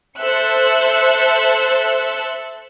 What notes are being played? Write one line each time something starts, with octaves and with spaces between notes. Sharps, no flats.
A4 C5 E5 E6 F#6 C#7